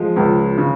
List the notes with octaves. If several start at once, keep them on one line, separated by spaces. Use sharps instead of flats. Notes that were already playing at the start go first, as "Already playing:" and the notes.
Already playing: F3 G#3
C#2
C#3